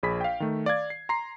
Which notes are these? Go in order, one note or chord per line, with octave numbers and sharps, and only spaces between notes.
A#1 G#4 B5 B6
F5 G5
D#3 A3
D5 F5 G#6
C7
A#5 C6 C7